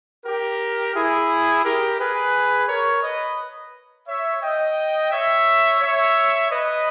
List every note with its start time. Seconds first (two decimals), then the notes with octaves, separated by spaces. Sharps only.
0.25 G4 A#4
0.95 E4 G#4
1.64 G4 A#4
1.99 G#4 B4
2.68 A#4 C#5
3.03 B4 D#5
4.08 C#5 E5
4.43 D#5 G5
5.11 C#5 E5
5.81 C#5 E5
6.51 B4 D#5